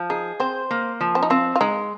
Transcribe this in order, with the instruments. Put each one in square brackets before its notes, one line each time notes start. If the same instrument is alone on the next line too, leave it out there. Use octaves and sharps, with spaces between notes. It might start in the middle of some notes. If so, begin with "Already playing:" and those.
Already playing: [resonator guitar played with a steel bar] F3
[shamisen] D#4 [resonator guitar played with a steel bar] G#4
[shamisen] C4 [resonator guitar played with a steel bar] C5
[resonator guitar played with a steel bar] A#3
F3
[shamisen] C4
D#4
[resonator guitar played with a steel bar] C4 [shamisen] F4
[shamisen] F4
[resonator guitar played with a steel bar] G#3 [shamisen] D#4